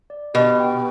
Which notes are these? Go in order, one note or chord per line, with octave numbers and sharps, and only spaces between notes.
D5
B2 G4
G5